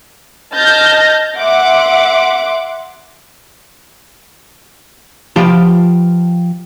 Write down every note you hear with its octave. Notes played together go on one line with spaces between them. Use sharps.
D#5 A5 F6 G6 A6 A#6
E5 F#5 C6 D6
F3 F4 G4 B4 A5